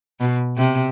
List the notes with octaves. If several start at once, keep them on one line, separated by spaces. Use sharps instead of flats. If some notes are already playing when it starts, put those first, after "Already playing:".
B2
C3